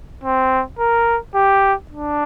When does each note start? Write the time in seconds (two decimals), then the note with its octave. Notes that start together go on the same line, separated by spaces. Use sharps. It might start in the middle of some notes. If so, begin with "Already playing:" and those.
0.24 C4
0.79 A#4
1.35 G4
1.91 D4